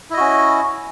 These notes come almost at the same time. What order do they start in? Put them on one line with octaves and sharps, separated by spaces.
E4 D#5 F#4 C#4